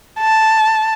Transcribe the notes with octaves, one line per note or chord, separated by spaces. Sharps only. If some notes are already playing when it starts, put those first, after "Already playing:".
A5